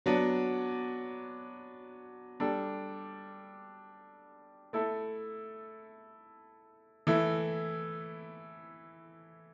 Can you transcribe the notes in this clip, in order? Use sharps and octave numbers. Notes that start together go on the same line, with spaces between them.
F#3 B3 D4
G3 D4 A4
A3 E4 A4
E3 A3 E4